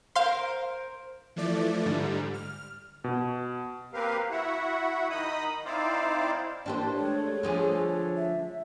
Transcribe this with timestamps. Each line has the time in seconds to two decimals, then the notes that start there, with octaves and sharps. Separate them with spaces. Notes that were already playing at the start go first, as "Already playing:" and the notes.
0.15 A#4 C5 F5 C6
1.36 E3 F3 A3 D5
1.86 G#2 D3 G3
2.34 F6
3.04 B2
3.93 A#3 C4 G4 A#4 B4 F5
4.31 E4 F#4 E5 F#5
5.10 D#3 D#4 D#5 B5 D#6
5.65 C4 D#4 E4 C5 D5 F5
6.66 E3 A#3 D4 G4 C5 A5
6.96 G#3 A3 C#5
7.43 D3 F3 G#4
8.16 E5